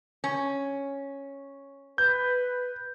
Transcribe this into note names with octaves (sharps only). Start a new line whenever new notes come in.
C#4
B4 G6